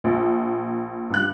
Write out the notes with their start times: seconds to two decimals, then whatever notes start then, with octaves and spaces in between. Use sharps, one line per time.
0.04 A#1
1.10 G2 F#6